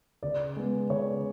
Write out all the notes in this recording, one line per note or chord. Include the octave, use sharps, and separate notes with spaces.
C#3 D5
G#3 B3
C#3 C#5